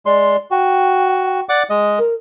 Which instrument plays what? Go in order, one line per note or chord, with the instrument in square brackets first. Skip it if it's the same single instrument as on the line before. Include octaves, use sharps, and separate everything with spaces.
[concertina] G#3 C6 [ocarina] D5
[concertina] F#4 [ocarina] G5
[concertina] D5 F#5 D6
G#3 D#5
[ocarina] A#4